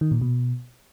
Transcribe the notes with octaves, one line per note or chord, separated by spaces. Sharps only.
D#3
A#2
B2